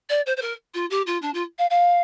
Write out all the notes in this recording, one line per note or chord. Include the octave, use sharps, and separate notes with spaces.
D5
C5
C5
A#4
F4
G4
F4
D4
F4
F5
F5